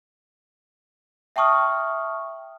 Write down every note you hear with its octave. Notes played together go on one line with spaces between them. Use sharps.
E5 G5 A5 C#6 D#6 F6